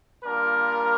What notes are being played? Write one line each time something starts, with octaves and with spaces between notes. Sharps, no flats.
G3 A#3 D4 F4 A#4